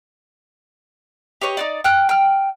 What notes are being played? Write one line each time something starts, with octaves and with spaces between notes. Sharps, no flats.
G4 B4 C#5 D#5
D#4 F#4 D5
G5 F6 F#6
G5 F6